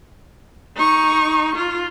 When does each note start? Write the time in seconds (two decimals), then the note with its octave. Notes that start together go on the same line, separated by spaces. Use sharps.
0.76 D#4 C#6
1.56 F4